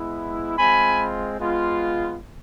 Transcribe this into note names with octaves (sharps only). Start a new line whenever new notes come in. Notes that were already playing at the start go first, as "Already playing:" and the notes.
Already playing: G#3 B3 E4
G#3 C4 F4 G#5 B5
G#3 B3 F4